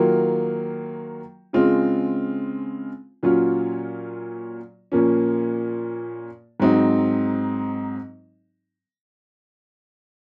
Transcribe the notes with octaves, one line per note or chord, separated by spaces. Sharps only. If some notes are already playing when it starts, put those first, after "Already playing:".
Already playing: D#3 F#3 A#3 F4
C#3 G#3 C4 F4
A#2 F#3 C#4 F4
A#2 F3 A#3 C#4
G#2 F#3 C4 D#4